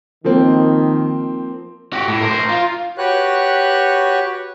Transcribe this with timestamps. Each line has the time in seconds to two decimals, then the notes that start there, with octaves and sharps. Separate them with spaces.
0.24 D#3 F3 A#3 C4
1.93 F#4 G4
2.08 A2
2.21 A#4 C5
2.49 F4
2.98 F#4 G4 B4 C#5 F#6